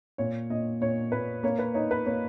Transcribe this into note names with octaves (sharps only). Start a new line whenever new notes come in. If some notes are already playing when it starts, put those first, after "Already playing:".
A#2 C#5
A#2 D#5
A#2 C#5
A#2 B4
A#3 C#5
B4
D#4 C#5
B4
A#3 C#5